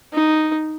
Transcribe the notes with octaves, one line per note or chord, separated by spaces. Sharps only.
D#4